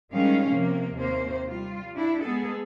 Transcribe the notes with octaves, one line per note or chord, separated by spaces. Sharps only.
D#3 G3 G#3 C#4 F5
C3 F3 A#3
D#2 C3 A#3 C5
G3 F4
D4 E4
G#3 B3 G#4 A4